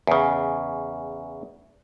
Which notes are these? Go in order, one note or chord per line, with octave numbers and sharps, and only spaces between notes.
E2 C#3